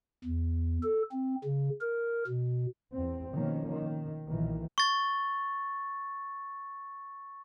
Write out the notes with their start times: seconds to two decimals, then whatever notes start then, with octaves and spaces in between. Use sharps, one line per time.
0.24 E2
0.83 A4
1.12 C4
1.44 C#3
1.81 A#4
2.27 B2
2.93 E2 C4
3.32 B2 D#3 F3 A#3 C#4
3.71 D#3
4.28 B1 A#2 D#3 E3
4.78 C#6 A6